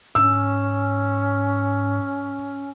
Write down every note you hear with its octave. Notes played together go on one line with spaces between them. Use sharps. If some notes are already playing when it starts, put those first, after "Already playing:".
G#2 C#4 E6